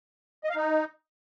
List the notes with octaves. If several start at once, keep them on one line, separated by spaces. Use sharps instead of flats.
D#5
F5
D#4